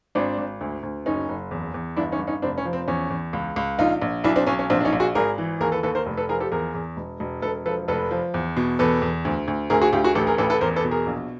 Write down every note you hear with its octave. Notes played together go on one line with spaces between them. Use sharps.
G#1 C4 D4
G#1
D2
D2
F#1 C#4 D#4
F#1
E2
E2
G1 D4 E4
C#4 D#4
G1
C#4 D#4
F1 C4 D4
C#4
F3
C4
E2 C#4
E2
C#2
C#2
A#1 D#4 F4
A#1
B1 D4 E4
C4 D4
B1 C#4
C#4
A#1 C4 D4
D4
C#4 D#4
A#1
F#4 G#4
G#1 G#4 A#4
E3
D#2 G#4 A#4
A4 B4
D#2 A4 B4
A#4 C5
F1
A4 B4
F3 G#4 A#4
G4 A4
E2 G#4 A#4
E2
E1
E1
E1 A4 B4
F3 A4 B4
F1 A4 B4
F3
E2
B2
E2 A4 B4
E2
D2
D2
D2 G#4 A#4
F#4 G#4
D2 F4 G4
F#4 G#4
A1 G4 A4
G#4 A#4
A1 A4 B4
A4 B4
E2 A#4 C5
A4 B4
B2
G#4 A#4
A#1